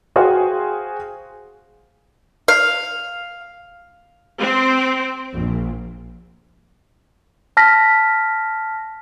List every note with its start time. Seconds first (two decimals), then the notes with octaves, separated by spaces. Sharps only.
0.16 F#4 G#4 C5 F5 G5
2.48 F5
4.39 C4
5.32 A#1
7.57 A5 F6 A#6 B6